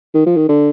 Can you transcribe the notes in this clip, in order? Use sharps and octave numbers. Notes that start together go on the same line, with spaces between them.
D#3
F3
D#3
D3